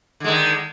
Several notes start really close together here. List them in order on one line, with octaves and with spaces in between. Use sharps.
D3 G#3 D#3